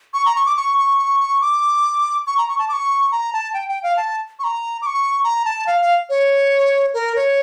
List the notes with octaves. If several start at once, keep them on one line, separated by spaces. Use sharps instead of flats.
C#6
A#5
C#6
D6
C#6
C#6
C#6
C#6
D6
C#6
A#5
C#6
A5
D6
C#6
A#5
A5
G5
G5
F5
A5
C#6
A#5
D6
C#6
A#5
A5
F5
F5
C#5
A#4
C#5